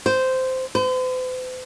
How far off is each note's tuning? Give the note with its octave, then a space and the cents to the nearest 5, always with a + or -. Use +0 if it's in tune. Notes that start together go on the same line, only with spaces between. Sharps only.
C5 -10
C5 -45